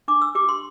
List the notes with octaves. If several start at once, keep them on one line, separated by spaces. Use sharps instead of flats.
D4 D6
E6
G4 D6
C6